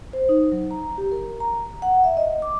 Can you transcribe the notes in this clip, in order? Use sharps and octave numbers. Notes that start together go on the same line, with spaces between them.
C5
D#4
F#3
A#5
G4
A#4
A#5
F#5
E5
D#5
D6